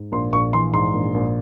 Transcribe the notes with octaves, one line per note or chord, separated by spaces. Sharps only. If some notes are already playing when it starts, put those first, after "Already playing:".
Already playing: G#2
A#1 C6
A#1 C#6
E3 C6
G#2 C6
A#1
A#1